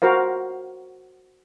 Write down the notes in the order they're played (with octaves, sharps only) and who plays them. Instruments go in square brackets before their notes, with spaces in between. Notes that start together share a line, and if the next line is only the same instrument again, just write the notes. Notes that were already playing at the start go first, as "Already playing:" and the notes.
[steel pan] F#4 A#4 C5 F5